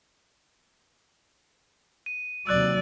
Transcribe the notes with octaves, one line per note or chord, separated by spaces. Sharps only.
D#7
D#2 C3 F#3 D5 E6 F#6